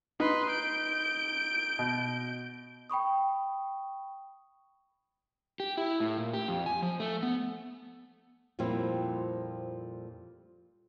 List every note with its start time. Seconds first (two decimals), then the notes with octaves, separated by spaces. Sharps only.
0.20 D#4 B4 C6
0.50 G6 D7
1.79 B2
2.90 G5 B5 C#6 D#6
5.60 G4
5.77 E4
6.00 A2
6.18 A#2
6.34 G4
6.48 F2
6.66 G#5
6.83 F3
7.00 A3
7.23 B3
8.59 F2 A#2 F3 G3 C4 E4